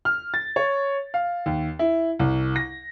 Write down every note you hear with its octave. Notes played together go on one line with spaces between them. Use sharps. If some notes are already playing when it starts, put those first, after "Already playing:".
F6
A6
C#5
F5
D#2
E4
C2
A#6